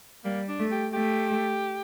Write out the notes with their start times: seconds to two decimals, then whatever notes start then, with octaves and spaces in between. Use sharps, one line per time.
0.24 G3 A#3
0.48 D4
0.59 A3
0.71 G4
0.93 A3 G4